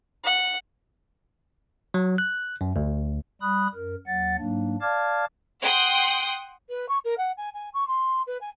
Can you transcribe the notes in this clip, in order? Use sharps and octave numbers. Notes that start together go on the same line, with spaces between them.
F#5
F#3
F#6
F#2
D2
G3 B5 D#6 F#6
F#2 A#4
D#2 F#3 F#5 A6
G#2 F#3 A#3 D4
D5 F5 A5 D6 F6 G#6
F#5 G5 C6 D#6
B4
C#6
A#4
F#5
G#5
G#5
C#6
C6
B4
G#5